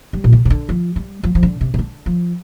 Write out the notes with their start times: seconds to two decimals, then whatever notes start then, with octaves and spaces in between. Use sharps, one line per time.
0.13 G3
0.24 A#2
0.33 C3
0.45 C3
0.50 D3
0.69 F3
0.96 G3
1.23 F3
1.35 F3
1.43 D3
1.61 C3
1.74 C3
1.79 D3
2.06 F3